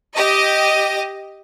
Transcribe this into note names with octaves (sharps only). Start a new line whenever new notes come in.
G4 D#5